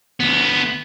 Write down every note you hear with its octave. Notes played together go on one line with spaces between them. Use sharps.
D2 B3